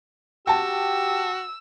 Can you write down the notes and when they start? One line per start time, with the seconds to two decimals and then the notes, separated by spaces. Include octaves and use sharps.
0.47 F#4 G4 G5 A5 E6